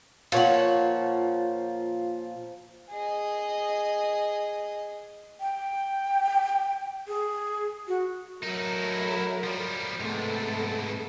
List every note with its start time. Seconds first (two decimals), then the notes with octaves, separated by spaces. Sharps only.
0.32 A#2 F3 C#5 F#5
2.90 G#4 D#5
5.40 G5
7.08 G#4
7.88 F#4
8.43 F#3 A3 D#4 E4 A#4 A#5
9.44 F3 G3
10.00 G#2 C3 A3 B3 G#4 A4